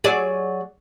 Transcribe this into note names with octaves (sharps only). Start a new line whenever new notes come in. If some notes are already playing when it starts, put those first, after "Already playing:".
F#3 G#4 D5